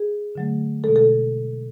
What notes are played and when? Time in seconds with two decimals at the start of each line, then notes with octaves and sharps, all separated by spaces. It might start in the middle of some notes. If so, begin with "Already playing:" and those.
Already playing: G#4
0.35 D3 F#3 A3
0.84 B2 G#3 A4
0.96 A4